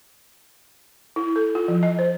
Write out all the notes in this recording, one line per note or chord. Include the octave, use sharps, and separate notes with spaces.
E4
A4
F4
F3
D#5
C5